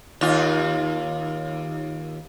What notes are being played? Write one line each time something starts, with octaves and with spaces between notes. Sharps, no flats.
D#2 F4